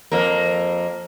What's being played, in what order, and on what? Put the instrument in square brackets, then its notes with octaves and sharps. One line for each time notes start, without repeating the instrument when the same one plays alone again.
[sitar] F2 A#3